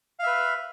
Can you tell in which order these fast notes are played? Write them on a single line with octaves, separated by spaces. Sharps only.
F5 E5 B4